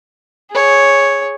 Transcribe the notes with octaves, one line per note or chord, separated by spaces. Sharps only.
G#4 C#5